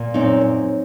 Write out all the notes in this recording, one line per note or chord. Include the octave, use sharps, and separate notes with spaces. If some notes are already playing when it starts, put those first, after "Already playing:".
Already playing: A#2
F#2 C4 D#4
F#2